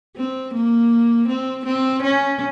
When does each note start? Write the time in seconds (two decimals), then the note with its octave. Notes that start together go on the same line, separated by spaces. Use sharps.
0.16 C4
0.54 A#3
1.28 C4
1.65 C4
2.02 C#4